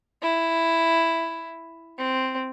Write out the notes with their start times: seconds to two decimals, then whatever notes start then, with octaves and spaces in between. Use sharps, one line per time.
0.22 E4
1.98 C4